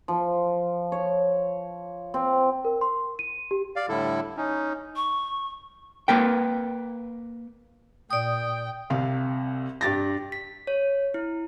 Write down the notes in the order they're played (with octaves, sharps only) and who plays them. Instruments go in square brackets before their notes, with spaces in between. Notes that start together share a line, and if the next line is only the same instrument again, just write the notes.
[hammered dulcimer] F3
C#5
C4
[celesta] A#4
C6
D#7
G4
[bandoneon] D5 F5
A2 D3 G3 E4 A4
C#4 D#4
[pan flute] C#6
[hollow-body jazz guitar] A#3 A#4 B4 G5
[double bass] A#2 [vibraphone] D5 D#6 [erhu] G5
[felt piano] C2 C3 F5
G2 G4 A6 A#6
[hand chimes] B6
C#5
E4